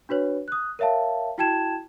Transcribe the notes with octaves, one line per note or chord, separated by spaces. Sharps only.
D4 F#4 B4 C#5
D#6 F#6
A#4 C#5 E5 F5 A5
E4 F#4 G5 A5 G#6 E7